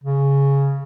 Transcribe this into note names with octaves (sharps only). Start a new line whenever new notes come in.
C#3